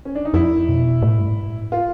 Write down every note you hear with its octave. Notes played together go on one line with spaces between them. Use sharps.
C#4
D4
D#4
F2 E4
B2
A2
G2
G#2
A2
F4